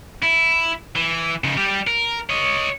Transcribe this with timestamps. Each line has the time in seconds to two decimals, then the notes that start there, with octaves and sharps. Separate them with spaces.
0.22 E4
0.96 E3
1.44 C#3 D#4
1.57 G3 G4
1.87 A#4
2.30 C#5 D#5